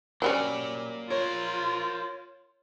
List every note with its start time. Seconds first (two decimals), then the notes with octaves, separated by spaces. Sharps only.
0.22 F#3 G3 A#3 C#4 D5
1.10 F4 A#4 C5 C#5